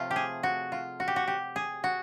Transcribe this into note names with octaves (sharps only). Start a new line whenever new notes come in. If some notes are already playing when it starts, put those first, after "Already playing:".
Already playing: C3 F3 A3 F4
G4
G#4
F#4
F4
F#4
G4
F#4
G4
G#4
F#4